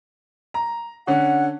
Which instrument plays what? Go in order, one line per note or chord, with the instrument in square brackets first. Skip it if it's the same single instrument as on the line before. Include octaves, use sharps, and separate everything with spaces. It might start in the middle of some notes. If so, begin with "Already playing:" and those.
[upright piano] A#5
[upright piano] D3 C#4 [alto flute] F#5